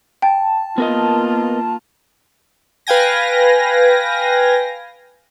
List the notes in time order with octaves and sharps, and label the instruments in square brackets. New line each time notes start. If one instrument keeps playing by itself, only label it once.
[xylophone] G5 [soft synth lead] A5
[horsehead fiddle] A#3 F4 [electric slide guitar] B3 A#4 D#5
[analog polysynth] B4 F5 G5 G#5 A#6